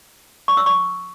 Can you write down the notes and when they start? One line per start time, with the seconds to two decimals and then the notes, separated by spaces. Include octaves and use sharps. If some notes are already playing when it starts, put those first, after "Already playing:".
0.48 C#6
0.57 E6
0.66 C#6